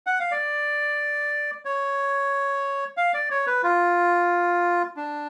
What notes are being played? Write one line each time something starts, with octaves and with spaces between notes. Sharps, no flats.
F#5
F5
D5
C#5
F5
D5
C#5
B4
F4
D4